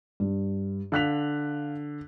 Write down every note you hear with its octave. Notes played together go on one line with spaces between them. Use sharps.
G2
D3 F5 F#6 B6 F7